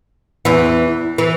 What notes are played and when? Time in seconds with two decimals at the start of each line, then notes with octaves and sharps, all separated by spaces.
0.45 E2 E3
1.18 E3